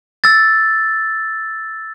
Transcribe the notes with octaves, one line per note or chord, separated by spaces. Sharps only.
E6 A6